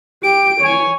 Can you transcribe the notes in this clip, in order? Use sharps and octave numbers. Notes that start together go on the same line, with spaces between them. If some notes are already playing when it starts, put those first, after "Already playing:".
G4 D7
C#5 G#5